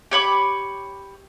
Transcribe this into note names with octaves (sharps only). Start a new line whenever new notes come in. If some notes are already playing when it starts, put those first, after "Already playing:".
G4 C#5 B5 D6